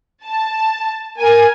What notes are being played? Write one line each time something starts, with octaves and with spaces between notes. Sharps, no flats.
A5
A#4 G#5